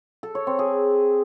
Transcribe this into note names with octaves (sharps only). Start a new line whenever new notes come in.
A4
C#5
C4
G#4